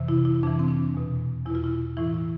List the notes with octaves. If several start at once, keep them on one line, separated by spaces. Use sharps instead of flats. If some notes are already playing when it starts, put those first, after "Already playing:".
Already playing: F2 C3 E3
E4
E4
F2 C3 E3 D4
C4
D4
E2 B2
E2 B2 E4
F4
E4
A2 E3 E4
E4